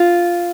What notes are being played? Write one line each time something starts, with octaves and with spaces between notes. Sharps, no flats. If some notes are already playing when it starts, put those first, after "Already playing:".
Already playing: F4